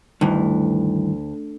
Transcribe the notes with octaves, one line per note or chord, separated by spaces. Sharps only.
D2 G2 D#3 E3